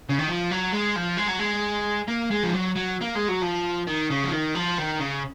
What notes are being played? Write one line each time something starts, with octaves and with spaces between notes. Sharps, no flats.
C#3
D#3
F3
F#3
G#3
F3
G#3
F#3
G#3
A#3
G#3
F3
F#3
F#3
A#3
G#3
F#3
F3
D#3
C#3
F3
D#3
F3
D#3
C#3